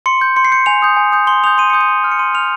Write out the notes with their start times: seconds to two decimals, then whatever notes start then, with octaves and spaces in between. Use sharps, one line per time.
0.06 C6 C#7
0.21 G6
0.36 C6 C#7
0.45 C7
0.52 G6 C#7
0.66 G#5 F7
0.82 D#6 G6
0.97 G#5
1.12 D#6 G6
1.27 C6 G7
1.44 D#6 G6 F7
1.58 C6 D#7
1.70 D#6 G6 C#7
1.81 D#7
1.89 C6
2.04 F6
2.12 C#7
2.19 C6 D#7
2.34 F6 F7